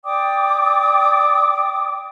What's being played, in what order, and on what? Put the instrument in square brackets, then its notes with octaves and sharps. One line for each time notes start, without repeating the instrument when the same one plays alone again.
[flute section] D5 G5 D6 D#6